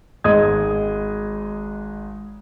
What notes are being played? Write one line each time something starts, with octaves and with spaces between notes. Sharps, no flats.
G#1 G#3 D#5 D#6 G#6